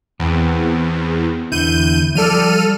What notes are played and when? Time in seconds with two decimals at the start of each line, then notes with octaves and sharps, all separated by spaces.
0.20 E2 B3 C4
1.52 E2 D3 E4 G6 D#7
2.15 F3 G3 A4 D5 F6 D#7